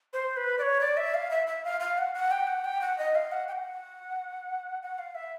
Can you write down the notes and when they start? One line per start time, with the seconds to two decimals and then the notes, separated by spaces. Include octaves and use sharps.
0.13 C5
0.37 B4
0.58 D5
0.62 C#5
0.81 D5
0.97 E5
1.14 F5
1.31 E5
1.47 E5
1.65 F5
1.80 F5
1.98 F#5
2.15 F#5
2.31 G5
2.47 F#5
2.65 G5
2.81 F#5
2.98 D#5
3.15 F5
3.32 F#5
3.48 G5
3.52 F#5
4.82 F#5
4.99 F5
5.15 E5